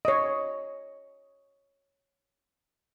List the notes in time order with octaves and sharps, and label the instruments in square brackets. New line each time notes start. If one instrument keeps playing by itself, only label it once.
[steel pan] C#5 D#5